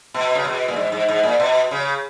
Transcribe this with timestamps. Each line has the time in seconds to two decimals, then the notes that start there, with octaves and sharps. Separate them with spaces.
0.14 B2
0.35 C#3
0.45 B2
0.68 A#2
0.76 G#2
0.92 G#2
1.08 G#2
1.23 A#2
1.40 B2
1.71 C#3